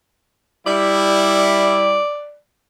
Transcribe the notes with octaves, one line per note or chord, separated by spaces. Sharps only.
G3 E4 D5